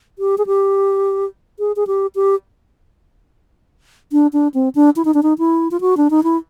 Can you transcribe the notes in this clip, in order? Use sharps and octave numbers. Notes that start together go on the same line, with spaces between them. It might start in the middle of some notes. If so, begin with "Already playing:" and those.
G4
G#4
G4
G#4
G#4
G4
G4
D4
D4
C4
D4
E4
D#4
D4
D#4
E4
F4
F#4
D4
D#4
E4